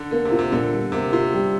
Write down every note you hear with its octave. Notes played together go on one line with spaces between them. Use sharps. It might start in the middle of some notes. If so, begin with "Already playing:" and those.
Already playing: D3
D3 A#3
C3
F4
C3
A#2 D3
G3
C3 A#3
C3 F4
G3